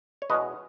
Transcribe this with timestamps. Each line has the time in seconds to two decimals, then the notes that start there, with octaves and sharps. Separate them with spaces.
0.22 C#5
0.30 E2 B2 G#3 C#4 B4 D#5